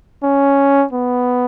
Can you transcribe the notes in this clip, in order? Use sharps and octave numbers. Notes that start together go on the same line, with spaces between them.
C#4
B3